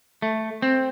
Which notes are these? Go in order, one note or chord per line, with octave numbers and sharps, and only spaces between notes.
A3
C4